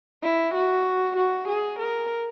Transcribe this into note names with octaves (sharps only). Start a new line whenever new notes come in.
E4
F#4
F#4
G#4
A#4